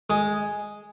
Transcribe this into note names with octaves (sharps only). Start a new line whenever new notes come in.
G#3